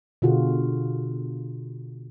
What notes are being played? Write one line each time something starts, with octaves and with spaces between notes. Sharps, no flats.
B2 D3 F4 F#4 G#4